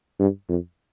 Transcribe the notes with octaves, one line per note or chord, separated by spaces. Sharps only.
G2
F2